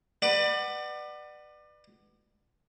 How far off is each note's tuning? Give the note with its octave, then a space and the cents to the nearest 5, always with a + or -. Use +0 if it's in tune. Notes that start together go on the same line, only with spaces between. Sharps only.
B4 +0 D5 +30 F#5 +20